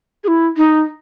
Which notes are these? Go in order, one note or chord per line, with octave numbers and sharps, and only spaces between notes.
G#4
E4
D#4